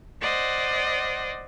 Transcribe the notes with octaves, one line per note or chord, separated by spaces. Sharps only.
C5 D5 D#5 F#5